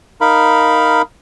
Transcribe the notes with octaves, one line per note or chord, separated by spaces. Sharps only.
D#4 A#4 F5 B5